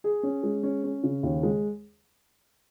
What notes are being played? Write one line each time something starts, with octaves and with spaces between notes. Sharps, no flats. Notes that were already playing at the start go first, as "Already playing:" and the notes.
G#4
C#4
G#3
C#4
C#4
C#3
D#2
G#3